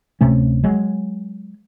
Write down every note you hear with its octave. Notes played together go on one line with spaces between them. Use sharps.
D1 C3 A3 C#4
F#3 G#3